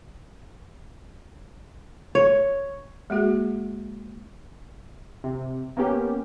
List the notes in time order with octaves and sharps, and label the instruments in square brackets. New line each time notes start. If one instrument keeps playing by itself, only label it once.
[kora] C#5
[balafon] G#3 A#3 F#4 G#4
[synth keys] C3
A#3 B3 C#4 G4